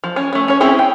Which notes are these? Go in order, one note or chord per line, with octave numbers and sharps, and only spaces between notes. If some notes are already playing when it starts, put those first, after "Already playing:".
F3
C#4
A3 C#4
C#4 C#5
C4 C#4 E4 G#4 C5
G5